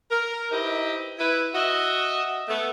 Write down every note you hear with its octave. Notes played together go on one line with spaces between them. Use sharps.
A#4
D#4 E4 G4 B4 C5 D#5
E4 B4
F#4 D#5 E5
A3 B3